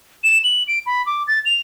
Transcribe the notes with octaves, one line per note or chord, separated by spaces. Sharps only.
E7
F#7
D7
B5
D6
A6
F7